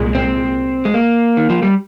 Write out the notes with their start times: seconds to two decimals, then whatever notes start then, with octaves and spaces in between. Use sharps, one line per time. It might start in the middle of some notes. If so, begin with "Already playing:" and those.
Already playing: C2 A#2 G#3
0.15 C4
0.85 G#3
0.94 A#3
1.37 D#3
1.50 F3
1.62 G3